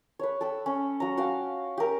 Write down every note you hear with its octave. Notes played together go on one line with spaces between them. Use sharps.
B4 C#5
A4 G5 E6
C#4
F#3 A#5
F#4 F5 G5 A5
G4 A#4